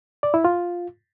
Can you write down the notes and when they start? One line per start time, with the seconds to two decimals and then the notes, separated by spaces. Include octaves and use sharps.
0.23 D5
0.34 E4
0.45 F4